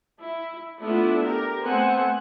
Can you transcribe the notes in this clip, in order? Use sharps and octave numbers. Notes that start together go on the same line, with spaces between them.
E4
A3 B3 D4 E4 F4
G4 A#4
A3 B3 C4 C5 F#5 G#5